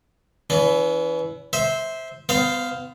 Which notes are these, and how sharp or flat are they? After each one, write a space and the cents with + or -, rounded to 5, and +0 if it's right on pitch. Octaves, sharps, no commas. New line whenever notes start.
E3 +0 C#4 +40
C5 +0 E5 -15
B3 +30 C5 +0 F5 -5